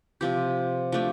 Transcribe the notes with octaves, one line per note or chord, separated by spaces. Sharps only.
C3 F3 C4 G4
F3 A3 D4 G4